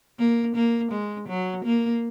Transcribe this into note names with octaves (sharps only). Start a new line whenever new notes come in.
A#3
A#3
G#3
F#3
A#3